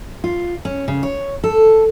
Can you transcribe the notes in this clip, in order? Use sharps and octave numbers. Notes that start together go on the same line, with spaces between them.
F4
C#4
C#3
C#5
A4